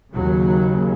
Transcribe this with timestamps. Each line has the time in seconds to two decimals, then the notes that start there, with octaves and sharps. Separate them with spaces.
0.13 D#2 C#3 F#3